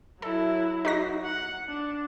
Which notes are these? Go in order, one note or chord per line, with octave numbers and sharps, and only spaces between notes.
F#3 E4 A4
D#4 F#4 A#6
F#5
D4